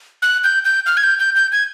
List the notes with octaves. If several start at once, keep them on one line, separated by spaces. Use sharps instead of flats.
F#6
G6
G6
F6
G#6
G6
G6
G6
G#6